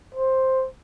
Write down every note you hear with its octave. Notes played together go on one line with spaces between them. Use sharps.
C5